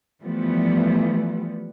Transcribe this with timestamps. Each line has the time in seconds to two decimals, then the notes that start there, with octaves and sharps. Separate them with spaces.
0.22 E3 F3 G3 A3 B3